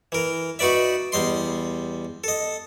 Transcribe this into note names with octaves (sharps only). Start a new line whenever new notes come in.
E3 A#4
D#4 F#4 B4 D5 E5
E2 G3 D#5 C6
A4 D#5